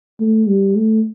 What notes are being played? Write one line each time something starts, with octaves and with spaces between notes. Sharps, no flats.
A3
G3
A3